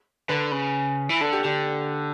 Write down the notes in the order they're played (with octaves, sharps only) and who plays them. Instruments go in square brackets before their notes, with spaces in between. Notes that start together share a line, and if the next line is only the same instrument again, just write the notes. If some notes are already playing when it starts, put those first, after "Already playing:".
[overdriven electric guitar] D3 [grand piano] B4
[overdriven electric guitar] C#3
E3
[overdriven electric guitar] D3 [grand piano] A4
[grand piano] G4
[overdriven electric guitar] D3 [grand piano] G4